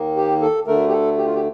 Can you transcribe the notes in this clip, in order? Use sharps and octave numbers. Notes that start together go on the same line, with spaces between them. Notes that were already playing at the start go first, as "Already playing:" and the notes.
Already playing: D#2 D#3 A#3
G4
A4
D2 D3 A3 A#4
G4
A4
G4
F4
G4